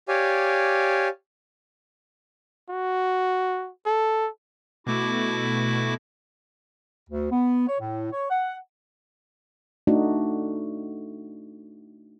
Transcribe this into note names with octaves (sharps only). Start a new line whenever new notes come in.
G4 C#5 D5 F5 G#5
F#4
A4
B2 A3 E4 F#4 D6
D2
B3
C#5
A2
C#5
F#5
A3 D4 D#4 F#4